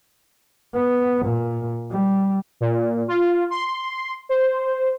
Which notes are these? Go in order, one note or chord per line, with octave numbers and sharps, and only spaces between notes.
B3
A#2
G3
A#2
F4
C6
C5